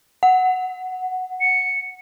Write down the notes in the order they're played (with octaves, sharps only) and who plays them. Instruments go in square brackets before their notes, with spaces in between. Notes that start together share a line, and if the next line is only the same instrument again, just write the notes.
[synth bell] F#5
[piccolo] C#7